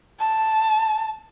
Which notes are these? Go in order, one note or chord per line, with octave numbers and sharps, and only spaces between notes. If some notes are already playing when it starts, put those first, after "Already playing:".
A5